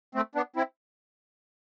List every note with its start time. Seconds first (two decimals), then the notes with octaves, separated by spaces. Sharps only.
0.15 A3 C4
0.35 B3 D4
0.56 C4 E4